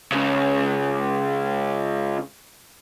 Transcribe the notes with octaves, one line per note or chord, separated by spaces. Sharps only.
C#2 C#3